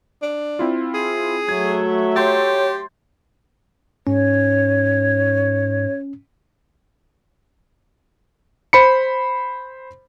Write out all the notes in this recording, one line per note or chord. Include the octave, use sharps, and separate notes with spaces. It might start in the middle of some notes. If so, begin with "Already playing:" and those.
D4
C4 E4 F4
G#4
F#3 A3 E5 G#6
G4 C#5 C6 G6 A6
G#2 C#4 C#5
C5 B5 C#7